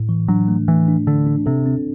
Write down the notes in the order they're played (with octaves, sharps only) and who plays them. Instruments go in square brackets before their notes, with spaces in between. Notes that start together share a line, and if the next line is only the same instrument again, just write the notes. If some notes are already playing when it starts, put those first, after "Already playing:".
Already playing: [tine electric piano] A2
E3
[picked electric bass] F#3 [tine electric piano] D4
[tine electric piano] A3
[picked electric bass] E3 [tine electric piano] A3
[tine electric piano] D4
[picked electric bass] D3 [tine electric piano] D4
[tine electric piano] D4
[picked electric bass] C3 [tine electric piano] A4
[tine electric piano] C4